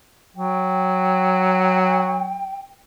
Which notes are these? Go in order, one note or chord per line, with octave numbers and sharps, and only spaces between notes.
F#3 G5